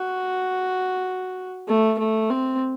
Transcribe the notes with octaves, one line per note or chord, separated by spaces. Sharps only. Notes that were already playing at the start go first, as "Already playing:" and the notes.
Already playing: F#4
A3
A3
C4